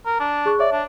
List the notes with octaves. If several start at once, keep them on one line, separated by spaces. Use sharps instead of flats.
A#4
D4
G#4 C#6 F#6
C#5 D5 E5
D4